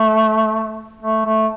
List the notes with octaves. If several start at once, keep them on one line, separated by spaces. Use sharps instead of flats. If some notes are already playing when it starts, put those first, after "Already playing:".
Already playing: A3
A3
A3